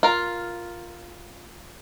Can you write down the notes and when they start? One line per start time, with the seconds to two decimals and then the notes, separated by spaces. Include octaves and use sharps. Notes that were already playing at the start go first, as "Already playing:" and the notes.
0.03 F4 A#4